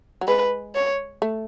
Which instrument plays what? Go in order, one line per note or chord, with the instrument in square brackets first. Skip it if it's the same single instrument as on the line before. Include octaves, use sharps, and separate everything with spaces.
[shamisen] F#3
[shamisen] G#3 [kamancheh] B4
[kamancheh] C#5
[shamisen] A3